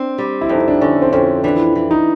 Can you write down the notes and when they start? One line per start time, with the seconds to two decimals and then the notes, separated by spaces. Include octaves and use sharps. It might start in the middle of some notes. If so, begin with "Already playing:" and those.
Already playing: C4 D4
0.18 G3
0.41 E4
0.49 F2
0.55 D#4
0.68 D4
0.81 D3 C#4
1.02 C4
1.12 F2 C#4
1.44 E3 D4
1.75 E3
1.91 D#4